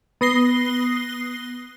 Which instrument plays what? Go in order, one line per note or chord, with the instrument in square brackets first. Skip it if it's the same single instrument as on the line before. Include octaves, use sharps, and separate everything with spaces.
[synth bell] B3 D#6 A#6 C7 G7